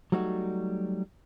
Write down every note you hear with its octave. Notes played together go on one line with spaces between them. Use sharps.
F#3 G3 A3 D#4 F#4